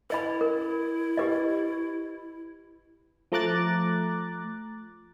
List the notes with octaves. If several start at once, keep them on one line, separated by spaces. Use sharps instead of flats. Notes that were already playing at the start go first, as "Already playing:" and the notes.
E4 B4 D#5 B5
A#4
G4 B4 D#5
F3 A3 A#5 D6 F#6 A6